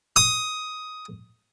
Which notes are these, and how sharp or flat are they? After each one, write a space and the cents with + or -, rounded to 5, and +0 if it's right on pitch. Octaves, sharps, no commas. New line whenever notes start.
D#6 +10